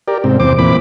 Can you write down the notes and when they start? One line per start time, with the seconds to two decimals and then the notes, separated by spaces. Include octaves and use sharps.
0.08 G4 A#4 D5
0.24 G#2 C3 C4
0.40 E2 C3 C5 D6
0.59 A#2 E3 C4 B5 D6